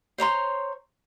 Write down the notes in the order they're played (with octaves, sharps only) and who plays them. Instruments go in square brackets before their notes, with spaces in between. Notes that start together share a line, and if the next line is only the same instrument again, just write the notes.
[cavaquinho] C5 C#5 A#5 C6